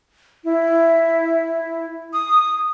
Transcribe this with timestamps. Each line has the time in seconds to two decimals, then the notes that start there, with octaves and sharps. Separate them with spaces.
0.44 E4
2.13 D#6